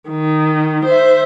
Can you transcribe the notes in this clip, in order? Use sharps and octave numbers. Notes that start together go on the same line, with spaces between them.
D#3
C5 E5